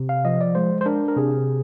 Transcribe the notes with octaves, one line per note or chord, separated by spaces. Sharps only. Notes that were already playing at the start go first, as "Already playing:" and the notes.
Already playing: C3
F5
F3 D#5
D5
G#3 C5
C5
D4 A#4
A#4
C3 G#4